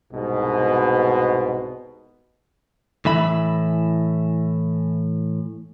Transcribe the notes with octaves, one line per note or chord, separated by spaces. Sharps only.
C2 G#2 B2
A2 E3 E5 B5